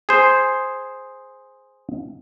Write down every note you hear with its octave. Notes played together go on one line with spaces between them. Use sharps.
G#4 C5